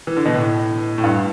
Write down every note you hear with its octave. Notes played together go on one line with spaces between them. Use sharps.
E3
D3
B2
A2
A2
G2